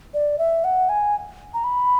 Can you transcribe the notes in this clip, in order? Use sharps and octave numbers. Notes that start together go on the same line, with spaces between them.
D5
E5
F#5
G#5
A#5
B5